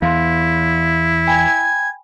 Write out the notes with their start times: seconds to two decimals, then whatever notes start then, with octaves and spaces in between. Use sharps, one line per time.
0.02 E2 E3 E4 F5 C6
1.27 G5 G#5 B5 G#6